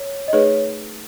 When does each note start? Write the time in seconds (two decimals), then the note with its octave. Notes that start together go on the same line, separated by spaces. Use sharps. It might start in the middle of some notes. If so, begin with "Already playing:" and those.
Already playing: C#5
0.28 D#5
0.33 A3 D#4 G#4 B4 C#5